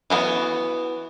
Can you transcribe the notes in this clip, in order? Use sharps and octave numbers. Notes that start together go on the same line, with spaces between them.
E3 A3 B3 F#4 C#5